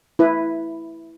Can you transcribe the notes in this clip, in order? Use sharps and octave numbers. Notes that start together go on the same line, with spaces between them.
E4 B4